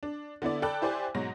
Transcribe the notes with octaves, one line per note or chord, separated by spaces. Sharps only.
D4
D3 B3 E4 D5
A4 D5 G5 A5 B5 F#6
E4 G4 C5 D5 G#5
G#2 B2 F#3 A#6